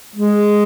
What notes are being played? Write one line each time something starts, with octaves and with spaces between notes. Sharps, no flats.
G#3